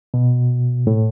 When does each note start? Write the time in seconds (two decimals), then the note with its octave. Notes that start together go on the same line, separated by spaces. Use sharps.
0.14 B2
0.87 A2